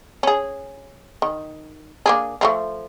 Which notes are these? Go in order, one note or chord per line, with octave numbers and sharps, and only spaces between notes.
C#4 G#4
D#3
A#3 D4 G#4
F3 G#3 A3